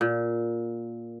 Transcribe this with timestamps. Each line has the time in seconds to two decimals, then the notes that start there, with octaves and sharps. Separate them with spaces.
0.01 A#2